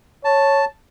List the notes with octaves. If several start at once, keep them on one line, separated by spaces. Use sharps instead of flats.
C#5 A5